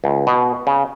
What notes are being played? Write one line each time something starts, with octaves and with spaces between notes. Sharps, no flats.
C#2
B2
C#3